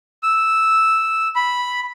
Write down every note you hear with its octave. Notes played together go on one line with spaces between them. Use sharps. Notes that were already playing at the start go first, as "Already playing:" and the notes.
E6
B5